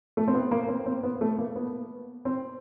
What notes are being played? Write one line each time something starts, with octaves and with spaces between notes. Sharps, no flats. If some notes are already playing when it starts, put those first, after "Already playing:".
A3
C4
B3
A#3
C4
C4
B3
A3
A#3
B3
C4